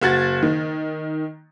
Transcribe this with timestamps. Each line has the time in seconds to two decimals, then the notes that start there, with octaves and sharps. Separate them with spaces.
0.02 F#1 F#4 G#6 A6
0.43 D#3